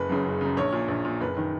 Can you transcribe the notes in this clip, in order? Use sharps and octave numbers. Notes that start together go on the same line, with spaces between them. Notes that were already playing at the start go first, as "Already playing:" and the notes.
Already playing: F#1 B4
F#2 C#3
F#1
F#2 C#3
A#1 C#5
A#2
A#1
A#2
F#1 B4
D#3